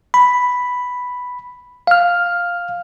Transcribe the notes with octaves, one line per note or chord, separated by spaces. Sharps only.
B5
F5 F6